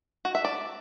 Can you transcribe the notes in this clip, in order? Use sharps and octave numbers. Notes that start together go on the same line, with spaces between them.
F#4
E5
D5